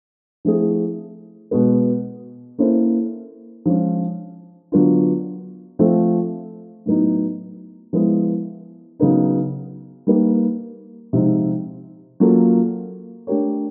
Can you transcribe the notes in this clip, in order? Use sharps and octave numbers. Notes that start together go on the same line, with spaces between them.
F3 A3 C4 E4 G#4
B2 G#3 B3
A#3 C#4 E4 A4 C5
F3 G#3 C#4
D3 F#3 B3 D4 F4
F3 A3 C4 F4 A4
A2 F#3 B3 D#4
F3 G#3 B3 E4
C#3 F#3 B3 D#4
G3 A#3 D#4 G4 B4
C3 F3 G#3 C4 D#4
F#3 A#3 C#4 F4 A4
A3 D4 G4 A#4 C#5